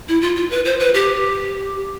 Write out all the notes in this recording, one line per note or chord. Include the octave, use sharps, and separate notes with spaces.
E4
F4
F4
B4
C5
B4
G4